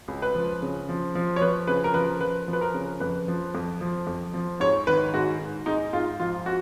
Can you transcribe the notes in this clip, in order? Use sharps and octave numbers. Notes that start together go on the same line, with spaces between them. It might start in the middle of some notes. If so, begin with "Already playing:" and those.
C#2
B4
F3
C#3
F3
F3
C#5
F3 B4
C#3 B4
A#4
F3 B4
F3 B4
F3
B4
A#4
C#3
F2 B4
F3
F2
F3
F2
F3
G#2 C#5
D#3 B4
G#2 F#4
G#2
G#2 D#4
G#2 F4
F3 F4
F#4